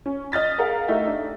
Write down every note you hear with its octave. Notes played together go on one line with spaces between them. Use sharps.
C#4
D#5 F6 A6 B6
G#4 A#4 F5 F#5
A3 D#4 E4 G4 E5
D4